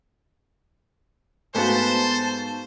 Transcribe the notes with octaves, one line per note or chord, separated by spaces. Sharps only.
G#2 A3 B3 F#4 C5 F5 A5